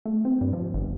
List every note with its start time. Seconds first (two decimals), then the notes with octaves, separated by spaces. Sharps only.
0.06 A3
0.25 C4
0.41 G2
0.53 F3
0.74 G1